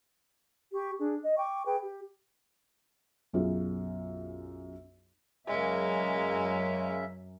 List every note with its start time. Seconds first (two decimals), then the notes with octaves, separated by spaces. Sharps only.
0.74 G4 C#6
0.99 D4 G#4
1.24 D#5
1.38 G5 C#6 D6
1.65 G#4 B4 G5
1.82 G4
3.33 B1 F#2 F4 G#4
5.47 F#2 C#3 G#3 A#3 C#4 E5